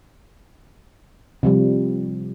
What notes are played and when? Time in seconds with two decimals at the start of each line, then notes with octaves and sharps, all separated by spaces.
1.43 C3 F3 G3